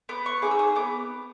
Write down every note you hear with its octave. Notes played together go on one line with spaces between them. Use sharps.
B3 D6
C#6
D#4 G#4 D6
E6
D#6
B3 D6